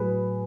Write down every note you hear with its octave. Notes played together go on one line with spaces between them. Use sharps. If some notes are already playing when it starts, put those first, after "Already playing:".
Already playing: A2 F#3 G#4 B4